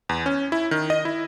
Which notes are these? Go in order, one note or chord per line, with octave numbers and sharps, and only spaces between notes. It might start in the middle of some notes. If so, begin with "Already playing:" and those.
E2
C#4
E4
D#3
D#5
E4